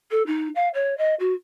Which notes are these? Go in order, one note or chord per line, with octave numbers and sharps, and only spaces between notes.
A4
D#4
F5
C#5
D#5
F#4